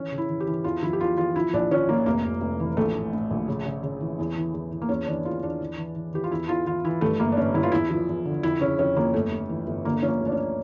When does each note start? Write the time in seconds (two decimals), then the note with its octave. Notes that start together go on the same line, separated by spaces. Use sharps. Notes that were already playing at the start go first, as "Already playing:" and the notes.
Already playing: E3 C#4
0.12 C#3
0.18 E4
0.29 E3
0.40 G4
0.47 E3
0.64 E2 F4
0.83 F3 E4
0.93 G4
1.01 E2 F4
1.17 E2 F4
1.36 F3 E4
1.53 A#1 D4
1.71 F3 C#4
1.89 F3 A#3
2.06 F1 A#3
2.24 F1
2.41 F1
2.60 E3
2.77 A#1 A3
2.95 A2
3.13 A2
3.30 A#1
3.48 C#3
3.65 C#3
3.83 C#3
4.00 E3
4.19 E2
4.37 E3
4.53 E2
4.72 E3
4.82 A#3
4.89 E2 C#4
5.07 E3 D4
5.25 E2 F4
5.43 E2 D4
5.61 E3
5.77 E3
5.96 E3
6.13 E3 G4
6.24 F4
6.31 E2 E4
6.49 E2 F4
6.66 E3 F4
6.85 E3 E4
7.01 G2 A3
7.20 G1 A#3
7.32 D4
7.37 G1 C#4
7.54 G2 E4
7.63 F4
7.72 E2 E4
7.90 F3
8.09 E2
8.25 D3
8.43 F2 E4
8.61 C#3 C#4
8.79 F2 C#4
8.96 F2 A#3
9.14 G1 A3
9.32 G1
9.49 E3
9.67 G1
9.85 D3 A#3
10.02 F3 C#4
10.08 A#3
10.20 D2
10.26 D4
10.32 C#4